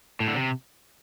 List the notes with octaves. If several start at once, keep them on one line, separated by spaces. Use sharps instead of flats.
A2
D3
C3